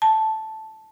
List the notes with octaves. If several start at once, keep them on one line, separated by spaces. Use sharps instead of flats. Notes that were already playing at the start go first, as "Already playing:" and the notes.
A5